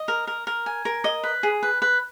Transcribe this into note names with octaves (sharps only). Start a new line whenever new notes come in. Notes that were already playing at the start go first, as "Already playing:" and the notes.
Already playing: D#5
A#4
A#4
A#4
G#5
A#4
D#5
B4
G#4
B4
B4